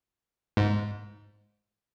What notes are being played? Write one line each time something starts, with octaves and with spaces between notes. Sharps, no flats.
G#2